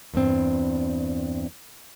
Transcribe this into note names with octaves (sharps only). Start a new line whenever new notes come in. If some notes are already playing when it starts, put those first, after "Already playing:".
E2 G2 C4